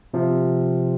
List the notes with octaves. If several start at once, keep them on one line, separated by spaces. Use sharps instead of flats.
C3 F3